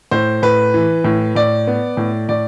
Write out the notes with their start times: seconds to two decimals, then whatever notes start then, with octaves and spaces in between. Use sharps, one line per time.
0.11 A2 C5
0.42 A2 B4
0.74 E3
1.04 A2
1.35 A2 D5
1.67 B3
1.97 A2
2.29 A2 D5